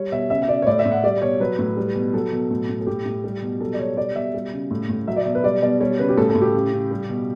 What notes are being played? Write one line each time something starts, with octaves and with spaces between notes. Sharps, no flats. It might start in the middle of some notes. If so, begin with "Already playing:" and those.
Already playing: G3 C#5
B2 E5
C#3 E5
E5
C#3 D5
C#5
A2 D5
E5
A2
F#5
G3 D5
B2 C#5
F#3 B4
A2
G3
B2
F#3 A4
B2
A2
A2
A4
A2 G4
A2
G3
B2
F#3 A4
D5
B2 C#5
G3 D5
B2 E5
G3
C#3
A2
A2
F#3 E5
D5
B2
B4
G3 D5
B2 D5
G3 C#5
C#3 B4
G4
A2 A4
A4
A2
G4
C#3
C#3
G3
B2